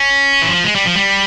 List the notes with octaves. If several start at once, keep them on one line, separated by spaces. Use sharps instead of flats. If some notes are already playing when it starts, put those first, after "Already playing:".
Already playing: C#4
E3
F3
G#3
G3
F3
G3